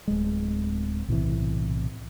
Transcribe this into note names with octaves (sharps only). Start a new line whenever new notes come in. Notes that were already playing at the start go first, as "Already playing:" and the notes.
D1 G#3
B1 A2 C3 E3